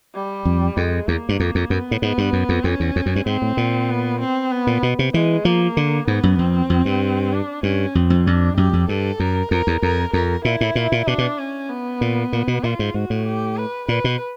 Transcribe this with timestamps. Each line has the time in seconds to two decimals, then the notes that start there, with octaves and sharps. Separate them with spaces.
0.15 G3
0.45 F2
0.76 F2 G#3
1.08 E2 A#3
1.29 G2
1.40 F2
1.55 F2
1.70 F#2 B3
1.91 A2
2.02 G#2 B3
2.18 G2
2.33 F#2
2.49 F2
2.64 F2 C#4
2.80 E2
2.96 F2
3.06 F#2
3.16 G2
3.26 G#2 C4
3.42 A2
3.57 A#2
3.89 B3
4.20 C4
4.51 B3
4.67 A#2
4.83 B2
4.99 C3
5.14 E3 G#3
5.45 F3 A#3
5.77 D3
6.08 G#2 B3
6.23 F#2
6.39 F2 C4
6.70 F2
6.85 G2
7.32 D4
7.63 G2 C#4
7.95 F2 C4
8.10 F2
8.26 F2 D4
8.57 F#2 G4
8.73 F2
8.89 G2 A4
9.19 F#2 A#4
9.51 F2 A#4
9.67 E2
9.82 F2 A#4
10.13 F2 A#4
10.45 A#2 E4
10.61 A2
10.75 A#2
10.92 A#2
11.07 B2 D4
11.18 B2
11.39 C#4
11.70 B3
12.01 A#2
12.33 A#2
12.48 B2
12.64 A#2 F4
12.79 G#2
12.94 G#2 F#4
13.10 A2
13.26 G4
13.57 B4
13.88 A#2 B4
14.04 B2